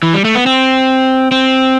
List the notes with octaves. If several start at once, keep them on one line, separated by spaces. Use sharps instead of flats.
E3
G3
A3
B3
C4
C4